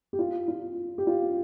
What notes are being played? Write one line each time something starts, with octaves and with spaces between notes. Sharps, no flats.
G4
F4
F4
G4
F4